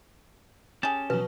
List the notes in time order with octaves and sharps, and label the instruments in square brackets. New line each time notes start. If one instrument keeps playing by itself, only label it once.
[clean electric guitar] C#4 A5 [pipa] G4 G#4
[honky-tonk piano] B2 F#3 [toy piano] B4